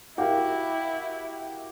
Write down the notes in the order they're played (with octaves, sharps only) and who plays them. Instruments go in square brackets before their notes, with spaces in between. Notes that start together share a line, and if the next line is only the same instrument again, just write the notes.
[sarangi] E4 [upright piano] F#4 F5 [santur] G4 A#4